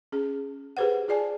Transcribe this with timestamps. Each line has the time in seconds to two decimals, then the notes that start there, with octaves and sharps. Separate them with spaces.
0.12 C#4 G#4
0.77 G4 G#4 B4 C5 F#5
1.08 F4 G#4 D5 G#5 A5